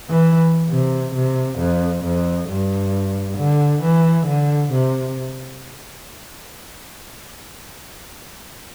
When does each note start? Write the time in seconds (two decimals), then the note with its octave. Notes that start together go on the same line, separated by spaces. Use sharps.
0.09 E3
0.69 C3
1.14 C3
1.58 F2
2.03 F2
2.48 G2
3.38 D3
3.82 E3
4.26 D3
4.72 C3